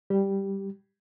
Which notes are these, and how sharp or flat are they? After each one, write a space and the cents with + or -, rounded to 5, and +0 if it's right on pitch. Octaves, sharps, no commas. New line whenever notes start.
G3 +0 G4 -5